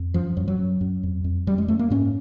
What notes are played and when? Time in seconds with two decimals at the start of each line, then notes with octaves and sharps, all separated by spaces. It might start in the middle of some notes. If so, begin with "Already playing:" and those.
Already playing: F2
0.14 F#2 F3
0.37 F#2 F#3
0.48 F#3
0.59 F#2
0.81 F#2
1.03 F2
1.24 F2
1.47 F#2 G3
1.58 G#3
1.68 F#2 A3
1.79 A#3
1.90 G#2 C#4